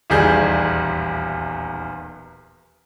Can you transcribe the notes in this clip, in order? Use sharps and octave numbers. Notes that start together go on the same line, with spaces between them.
D#1 B1 E2 G3 G#4 G6